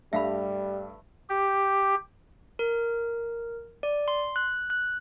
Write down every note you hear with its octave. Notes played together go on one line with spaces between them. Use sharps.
G2 G3 A3 E5 F5 B5
G4
A#4
D5
C6
F#6
F#6